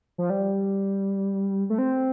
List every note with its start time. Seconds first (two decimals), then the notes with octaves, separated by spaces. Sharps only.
0.18 F3
0.30 G3
1.70 A3
1.78 C4